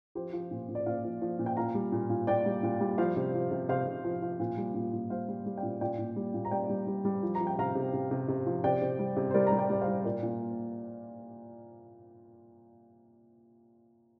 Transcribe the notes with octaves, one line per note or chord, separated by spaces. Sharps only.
F3 G4 C5
F3
A#2
A#2
D5
A#2 C5 F5
F3
F3
A#2
G5
A#2 F5 A#5
G3
A#2
A#2
A#2 D5 G5
G3
A#2
G3
F3 C5 F5
C3
F3
C3
C3 C5 F5
C3
F3
F3
A#2
G3
A#2
A#2
G3 C5 F5
G3
G3
D5 G5
A#2
A#2 D5 G5
A#2
G3
A#2
A#5
G3 D5 G5
G3
G3
G3
F3
A#5
F3
G5
C3 F5 A#5
C3
C3
C3
C3
F3
C3 D5 G5
C3
G3
C3
C5
G3 A#4 D5
A#5
G3
D5 G5
G3 D5
C5 F5
G3
A#2 A#4 D5
A#2